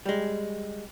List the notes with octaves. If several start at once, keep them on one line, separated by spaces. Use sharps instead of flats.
G3 G#3